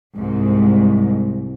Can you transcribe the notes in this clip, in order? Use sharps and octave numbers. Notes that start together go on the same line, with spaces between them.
C2 G#2